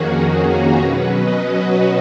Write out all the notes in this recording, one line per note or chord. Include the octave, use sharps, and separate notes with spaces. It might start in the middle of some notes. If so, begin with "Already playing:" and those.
Already playing: F2 D#3 A#3 C#4 F#4 G#4
G#4
A#4
B2 F#3 C#4 B4
D#5
F#4